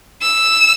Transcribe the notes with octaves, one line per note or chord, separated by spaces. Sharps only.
E6